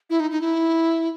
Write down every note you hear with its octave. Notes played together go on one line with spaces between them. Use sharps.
E4
D#4
D#4
E4